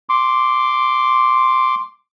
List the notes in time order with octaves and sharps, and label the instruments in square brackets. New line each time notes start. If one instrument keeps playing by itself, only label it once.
[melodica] C6 D6